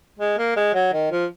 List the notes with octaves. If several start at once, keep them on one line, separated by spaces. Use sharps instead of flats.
G#3
A#3
G#3
F#3
D#3
F3